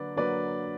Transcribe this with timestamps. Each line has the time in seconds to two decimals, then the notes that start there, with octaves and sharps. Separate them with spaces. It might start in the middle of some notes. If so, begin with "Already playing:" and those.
Already playing: D3 F#3 A#3 B4 D5
0.16 D3 F#3 A#3 B4 D5